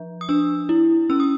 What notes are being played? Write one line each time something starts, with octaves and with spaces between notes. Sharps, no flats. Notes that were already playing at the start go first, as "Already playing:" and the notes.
Already playing: F3
D#6
D4 E6
E4
C#4 E6
D#6